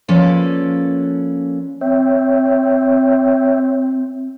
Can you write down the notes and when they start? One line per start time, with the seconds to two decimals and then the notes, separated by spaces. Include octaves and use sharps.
0.08 F3 A#3 C#4 A4 B4 D5
1.81 C4 C#5 E5 G5